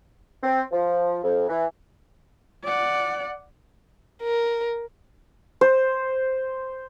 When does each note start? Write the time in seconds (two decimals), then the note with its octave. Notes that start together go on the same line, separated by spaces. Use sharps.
0.43 C4
0.72 F3
1.24 F2
1.49 E3
2.64 D5 F#5
4.23 A#4
5.61 C5